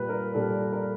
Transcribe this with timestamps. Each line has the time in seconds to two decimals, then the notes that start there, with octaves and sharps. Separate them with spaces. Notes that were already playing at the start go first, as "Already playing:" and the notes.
Already playing: A#2 G3 B4
0.09 A#4
0.34 A#2 G3 A4
0.73 A#4